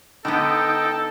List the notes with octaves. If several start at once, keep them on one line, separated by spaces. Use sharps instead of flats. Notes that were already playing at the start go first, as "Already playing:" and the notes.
D3 B3 D#4 A4 G5